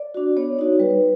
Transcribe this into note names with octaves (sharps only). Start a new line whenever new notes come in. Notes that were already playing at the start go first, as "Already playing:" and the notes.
Already playing: D5
D4 F#4
B3 C#5
D#4 F#4
G3 B4